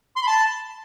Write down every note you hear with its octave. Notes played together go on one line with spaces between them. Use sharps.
C6
B5
A5